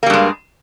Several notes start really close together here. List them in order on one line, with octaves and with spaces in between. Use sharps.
A#3 G3 G2 G#3